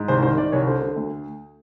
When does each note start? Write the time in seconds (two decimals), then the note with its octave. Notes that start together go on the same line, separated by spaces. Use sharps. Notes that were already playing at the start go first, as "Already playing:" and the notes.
Already playing: G#2
0.08 C2 C5
0.23 D#3 C5
0.37 D#3 D5
0.52 C2 C#5
0.67 D3 C5
0.82 D3
0.96 D2